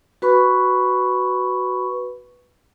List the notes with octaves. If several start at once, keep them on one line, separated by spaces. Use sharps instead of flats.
F#4 B4 B5 C#6